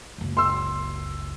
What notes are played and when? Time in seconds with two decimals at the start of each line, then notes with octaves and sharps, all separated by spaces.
0.18 F#1 C#2
0.37 C6 E6